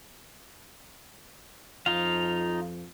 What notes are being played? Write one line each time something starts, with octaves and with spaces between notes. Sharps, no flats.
F2 F3 D#4 F4 F5